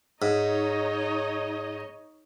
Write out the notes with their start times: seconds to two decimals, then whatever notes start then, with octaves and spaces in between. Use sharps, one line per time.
0.22 G#2 D#4 C#5 D#5